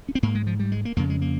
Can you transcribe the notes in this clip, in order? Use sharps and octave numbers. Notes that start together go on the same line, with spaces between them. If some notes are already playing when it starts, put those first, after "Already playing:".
C#4
C4
G#2 A#3
G#3
F3
G3
G#3
A#3
F2 C#3 A#3
G#3
A#3